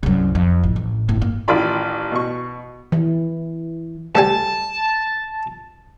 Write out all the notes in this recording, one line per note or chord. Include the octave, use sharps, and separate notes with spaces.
C2 F#2
F2
A1
A1
G1 A2
A#3
A1 D#3 F4 D5 B5 C6
B2 C#6
E3
D2 G3 G#5 A5